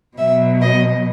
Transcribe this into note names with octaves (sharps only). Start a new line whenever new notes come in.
B2 F#3 E5
D#5